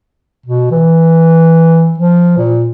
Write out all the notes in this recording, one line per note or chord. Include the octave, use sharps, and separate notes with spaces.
B2
E3
F3
A#2